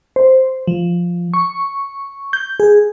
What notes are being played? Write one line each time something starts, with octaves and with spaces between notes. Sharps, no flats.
C5
F3
C#6
G6
G#4